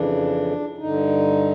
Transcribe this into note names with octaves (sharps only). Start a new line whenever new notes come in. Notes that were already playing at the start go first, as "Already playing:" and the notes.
Already playing: F2 C#3 E3 D4
G2 D#4
D3